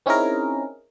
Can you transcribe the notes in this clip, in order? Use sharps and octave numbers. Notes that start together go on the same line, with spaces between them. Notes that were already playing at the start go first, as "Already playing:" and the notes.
C4 C#4 D#4 E4 G#4 A#4